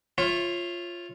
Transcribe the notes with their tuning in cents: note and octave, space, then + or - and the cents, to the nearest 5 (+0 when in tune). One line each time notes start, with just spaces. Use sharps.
F4 +0 C#5 -25 E5 +20